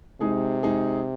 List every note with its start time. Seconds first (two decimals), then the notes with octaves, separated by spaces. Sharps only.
0.21 C3 G#3 D#4 G#4
0.63 G#3 D#4 G#4